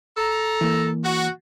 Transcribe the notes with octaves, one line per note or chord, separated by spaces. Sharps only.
A4 A#5
E3 A#3
F#4